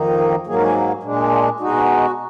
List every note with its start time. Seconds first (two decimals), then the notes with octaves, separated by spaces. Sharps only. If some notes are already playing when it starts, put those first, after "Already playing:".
Already playing: F2 D#3 A#3 D#4
0.19 A#4
0.47 G#2 F#3 A#3 G#4
0.54 A#4
0.62 G#4
1.03 A#2 G#3 D4
1.32 F4
1.60 B2 G#3 D#4 F#4